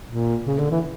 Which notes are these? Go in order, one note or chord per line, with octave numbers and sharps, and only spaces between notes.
A#2
C#3
D3
E3